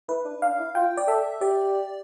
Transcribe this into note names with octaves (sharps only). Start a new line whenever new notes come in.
E4 B4
D4
D4 F5
E4
F4 G5
D5
A4 E5
G4 D5